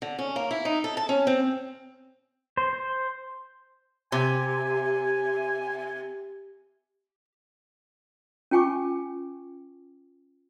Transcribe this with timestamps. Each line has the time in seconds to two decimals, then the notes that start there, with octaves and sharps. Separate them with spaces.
0.02 D3
0.19 C#4
0.36 A#3
0.51 E4
0.65 D#4
0.84 A4
0.97 A5
1.09 C#4
1.27 C4
2.57 C5
2.73 C5
4.12 C3 G#5
8.51 C#4 F4 G5 G#5 C#6 D6